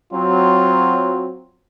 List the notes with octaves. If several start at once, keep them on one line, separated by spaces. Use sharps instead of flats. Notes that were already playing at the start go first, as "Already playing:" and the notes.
F#3 C4 F4